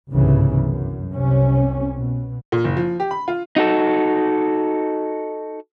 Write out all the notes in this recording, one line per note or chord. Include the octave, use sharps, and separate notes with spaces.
G1 C2 G#2 C#3 E3
F#2
C2 C3 C#4
B2
A#2
F#1
F3
G4
B5
F4
D#4 F#4 A4